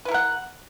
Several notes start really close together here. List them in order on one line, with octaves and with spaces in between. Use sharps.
B4 E4 A#4 F#5